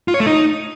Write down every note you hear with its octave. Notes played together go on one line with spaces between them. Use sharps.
F4
C#5
A3
D#4